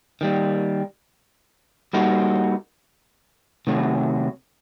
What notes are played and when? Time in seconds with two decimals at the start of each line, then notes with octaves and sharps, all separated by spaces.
0.21 D#3 G3 A#3
1.93 G3 A#3 D#4 F#4 A4
3.67 C3 D#3 F#3 A3